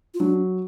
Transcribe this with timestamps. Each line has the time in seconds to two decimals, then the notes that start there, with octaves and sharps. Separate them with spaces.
0.14 F4
0.20 F#3 D4